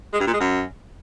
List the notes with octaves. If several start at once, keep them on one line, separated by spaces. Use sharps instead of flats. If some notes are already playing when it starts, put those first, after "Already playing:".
G#3
G2
A#2
G#3
F#2